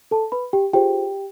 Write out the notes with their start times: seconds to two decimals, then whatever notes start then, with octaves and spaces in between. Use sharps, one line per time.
0.11 A4 A5
0.32 B4 B5
0.53 G4 G5
0.73 F4 G4 G#4 C5 G5